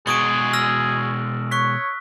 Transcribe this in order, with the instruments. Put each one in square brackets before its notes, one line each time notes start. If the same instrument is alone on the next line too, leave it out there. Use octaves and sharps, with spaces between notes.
[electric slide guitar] B2 G#3 F#4 [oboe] G#4 [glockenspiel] C#6 D#6 D7
[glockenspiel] E6 F6 A#6
[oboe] C#5 [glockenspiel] C#6 F#6 B6